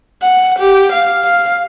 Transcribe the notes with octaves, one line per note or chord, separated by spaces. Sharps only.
F#5
G4
F5
F5